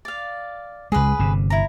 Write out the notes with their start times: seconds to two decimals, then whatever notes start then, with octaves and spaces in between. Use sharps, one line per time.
0.05 D5 F5
0.92 C#2 G#3 G#4 B4
1.19 G1 C3
1.50 E4 A#5